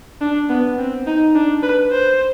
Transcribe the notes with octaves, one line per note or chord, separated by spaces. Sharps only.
D4
B3
C4
D#4
D4
B4
C5